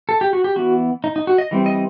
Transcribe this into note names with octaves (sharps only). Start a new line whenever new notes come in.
A4
G4
F#4
G4
E3 B3 F#4
D#4
D#4
F#4
D#5
E3 G3 C4
D#5